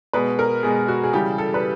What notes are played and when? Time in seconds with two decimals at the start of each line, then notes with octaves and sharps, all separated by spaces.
0.13 B2 G#3 B4
0.39 A#4
0.63 B2 G#3 G#4
0.88 F#4
1.04 G#4
1.13 C#3 E3 G3 G4
1.38 A4
1.54 B4